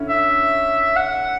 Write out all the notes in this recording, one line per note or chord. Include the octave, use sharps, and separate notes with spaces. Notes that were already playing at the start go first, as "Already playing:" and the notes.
Already playing: D3 C#4 E4
E5
F#5